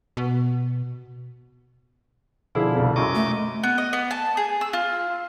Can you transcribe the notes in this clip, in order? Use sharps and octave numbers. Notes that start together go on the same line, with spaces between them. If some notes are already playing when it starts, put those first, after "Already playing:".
B2
B2 D3 F3 E4 G#4
C2 F2
F#2 D#5 A#5 C#6 D6
A3
B3
D#5
B3
A5
G#4
E6
F4